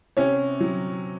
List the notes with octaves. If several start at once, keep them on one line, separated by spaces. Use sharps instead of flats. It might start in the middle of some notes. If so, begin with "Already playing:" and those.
C3 C#4 C#5
F#3